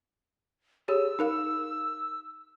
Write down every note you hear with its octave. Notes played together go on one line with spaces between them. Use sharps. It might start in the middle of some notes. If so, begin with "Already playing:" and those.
G4 G#4 C#5 E6
D#4 A#4 F5